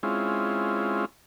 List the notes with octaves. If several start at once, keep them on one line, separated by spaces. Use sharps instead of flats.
G#3 C4 C#4 E4 F4